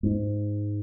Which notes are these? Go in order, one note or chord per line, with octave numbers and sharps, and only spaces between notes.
G#2